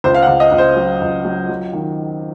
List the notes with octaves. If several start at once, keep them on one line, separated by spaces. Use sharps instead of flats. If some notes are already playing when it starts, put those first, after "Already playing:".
C#2 C5
F5
F#5
C#2
D#5
C#2
C5
F#3
C#2
F#3
F#3
D#3